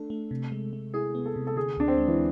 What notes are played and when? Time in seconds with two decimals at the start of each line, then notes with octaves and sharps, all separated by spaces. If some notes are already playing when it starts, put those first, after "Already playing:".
Already playing: A3 D4 A4
0.10 A3
0.31 C3
0.52 G#3
0.73 G#3
0.94 E4 G#4
1.15 B3
1.26 A4
1.36 C3
1.47 A4
1.56 D3 G#4
1.77 D2 D4
1.88 C4
1.98 G#3
2.08 E3